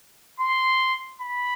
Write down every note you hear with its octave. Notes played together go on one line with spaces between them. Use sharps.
C6
B5